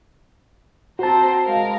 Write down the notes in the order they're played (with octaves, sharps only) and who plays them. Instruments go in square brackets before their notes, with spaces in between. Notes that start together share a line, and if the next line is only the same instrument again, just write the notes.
[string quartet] C4 C5 A#5 [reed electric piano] F#4 A5
[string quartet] G#3 A#4 F5